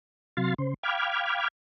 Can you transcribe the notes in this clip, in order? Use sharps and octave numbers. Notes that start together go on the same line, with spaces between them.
C3 F#3 F5 C6 A6
C#3 C5
F5 G5 B5 D6 F6 G#6